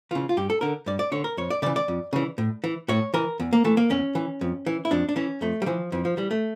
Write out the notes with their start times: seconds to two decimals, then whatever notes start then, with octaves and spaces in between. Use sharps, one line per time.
0.11 C#3 E3 F4
0.29 F4
0.37 G2 G4
0.50 A4
0.61 D3 A#4
0.86 G2 D5
0.99 D5
1.12 D3 C#5
1.24 A#4
1.37 F2 C#5
1.50 D5
1.62 C#3 E3 D5
1.76 D5
1.88 F2
2.13 C#3 E3
2.38 A2
2.64 E3
2.88 A2 C#5
3.14 E3 A#4
3.40 E2
3.53 A#3
3.64 E3 A3
3.77 A#3
3.90 E2 C#4
4.15 E3
4.41 F2
4.66 E3
4.85 E4
4.91 F2 D4
5.09 D4
5.16 E3 C#4
5.41 F2 A3
5.62 G3
5.66 E3 F3
5.92 F2 E3
6.05 F3
6.17 E3 G3
6.31 A3